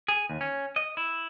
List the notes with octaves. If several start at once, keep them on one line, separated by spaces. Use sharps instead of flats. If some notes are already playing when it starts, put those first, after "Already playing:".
G#4
D#2
C#4
D#5
E4